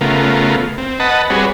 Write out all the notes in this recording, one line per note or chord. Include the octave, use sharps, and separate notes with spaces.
C#3 A3 B3 F4 A#4
C4
B4 D#5 F#5 A5
G3 C4 F#4 G#4 B4 C#5